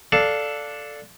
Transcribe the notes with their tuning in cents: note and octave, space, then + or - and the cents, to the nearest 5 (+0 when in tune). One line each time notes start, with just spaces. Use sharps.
D4 +0 A4 +0 F5 +0